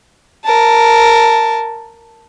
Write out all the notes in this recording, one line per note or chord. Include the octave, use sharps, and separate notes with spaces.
A#4 A5